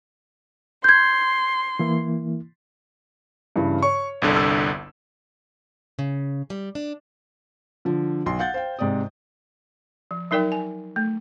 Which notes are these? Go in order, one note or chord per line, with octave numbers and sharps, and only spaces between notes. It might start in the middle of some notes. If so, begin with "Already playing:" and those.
C6 G6 G#6
E3 A#3 E4
G2 C#3 E3
C#5 C#6
G1 C2 D3
E6
C#3
G3
D4
D3 F3
B1 C6
F5 F#5 G6 A6
C5 F5 G5
G#2 C3 D5 G5 D#6
F3
F#3 D#4 A#4 D5 G5
G#5
A3